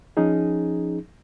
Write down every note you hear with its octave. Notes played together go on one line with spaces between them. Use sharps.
F3 C#4 D#4 G#4